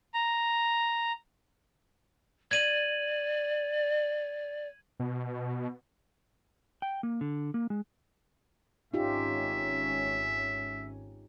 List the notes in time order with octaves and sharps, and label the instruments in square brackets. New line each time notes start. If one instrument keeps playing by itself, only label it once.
[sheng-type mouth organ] A#5
[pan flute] D5 [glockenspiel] G#6 D#7 F#7
[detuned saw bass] B2
[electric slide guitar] G5
A#3
D3
A#3
G#3
[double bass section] G#1 C#4 [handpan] D#4 F4 G4 [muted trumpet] E5